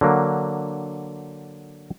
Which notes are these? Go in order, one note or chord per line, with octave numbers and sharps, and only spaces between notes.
D3 F#3 A#3